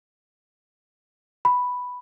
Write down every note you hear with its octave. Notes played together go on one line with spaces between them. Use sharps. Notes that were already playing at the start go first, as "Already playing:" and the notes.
B5